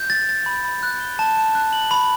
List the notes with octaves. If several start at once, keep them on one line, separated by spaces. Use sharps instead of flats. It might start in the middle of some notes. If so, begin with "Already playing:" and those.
Already playing: G6
A6
A6
B5
B5
F#6
G7
A5
A5
F#6
F#7
B5